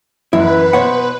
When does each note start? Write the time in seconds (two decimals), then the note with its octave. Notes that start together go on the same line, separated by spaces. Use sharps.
0.33 A1 F#2 E3 E4 B4
0.73 B2 C5 C#5 F#5 C6